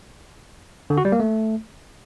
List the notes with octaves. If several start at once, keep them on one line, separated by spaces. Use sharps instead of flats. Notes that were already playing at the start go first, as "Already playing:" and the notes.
D3
F#4
G3
A#3
A3